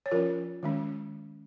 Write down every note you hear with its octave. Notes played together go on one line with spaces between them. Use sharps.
C#5
F3 C#4 F4 A#4
D#3 G#3 C#4